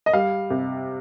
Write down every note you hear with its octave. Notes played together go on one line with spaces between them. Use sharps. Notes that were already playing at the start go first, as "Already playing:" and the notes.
D#5
G3 F5
C3